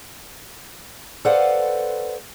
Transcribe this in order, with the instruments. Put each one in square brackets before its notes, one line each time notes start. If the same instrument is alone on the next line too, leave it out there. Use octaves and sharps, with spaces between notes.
[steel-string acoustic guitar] A4 B4 C5 D5 F5 F#5